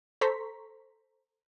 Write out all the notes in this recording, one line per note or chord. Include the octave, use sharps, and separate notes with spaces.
A4 C5 A#5 C6 C#6 B6